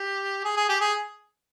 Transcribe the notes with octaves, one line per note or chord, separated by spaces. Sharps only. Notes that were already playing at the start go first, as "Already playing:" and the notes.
Already playing: G4
G#4
G#4
G4
G#4